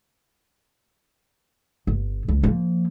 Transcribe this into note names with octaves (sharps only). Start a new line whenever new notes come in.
G1
C#2
F3 A#3